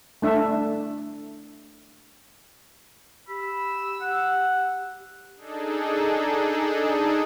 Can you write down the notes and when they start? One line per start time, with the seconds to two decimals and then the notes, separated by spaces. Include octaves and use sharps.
0.22 A3 D4 E5
3.29 G4 B5 E6
4.01 F#5
5.36 D4 D#4 G#4 A4